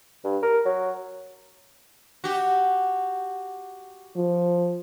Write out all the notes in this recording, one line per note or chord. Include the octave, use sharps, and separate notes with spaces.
G2
A#4
F#3
F#4 G4
F3